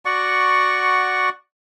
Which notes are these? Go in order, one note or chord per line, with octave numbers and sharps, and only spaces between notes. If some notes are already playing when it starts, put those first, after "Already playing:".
F#4 D5 F#5 C#6